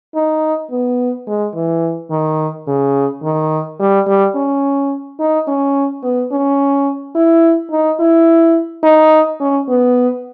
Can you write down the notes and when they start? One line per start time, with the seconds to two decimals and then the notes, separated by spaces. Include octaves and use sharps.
0.15 D#4
0.71 B3
1.28 G#3
1.55 E3
2.11 D#3
2.67 C#3
3.23 D#3
3.80 G3
4.07 G3
4.36 C#4
5.20 D#4
5.48 C#4
6.03 B3
6.32 C#4
7.15 E4
7.72 D#4
8.00 E4
8.83 D#4
9.40 C#4
9.68 B3